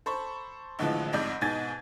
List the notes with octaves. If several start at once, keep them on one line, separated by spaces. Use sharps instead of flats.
A4 C5 B5 C#6
G#1 A2 D3 E3 F3 G#3
A1 F2 G#2 D5 D#5 G6
G#2 B2 D#4 G#5 G#6 A6